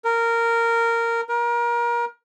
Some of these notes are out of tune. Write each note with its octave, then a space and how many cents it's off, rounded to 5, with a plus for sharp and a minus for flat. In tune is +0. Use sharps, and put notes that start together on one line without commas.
A#4 -10
A#4 +30